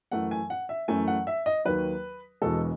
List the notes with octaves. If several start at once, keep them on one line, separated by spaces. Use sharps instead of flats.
F#2 E3 A3 F#5
G#5
F#5
E5
F#2 E3 A3 C#4 G#5
F#5
E5
D#5
D#2 D#3 F#3 B4
E1 E2 B2 G#3 A4